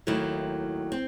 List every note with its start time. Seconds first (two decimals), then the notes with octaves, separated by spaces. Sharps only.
0.07 D#2 D#3 F#3 A3 E4
0.92 C4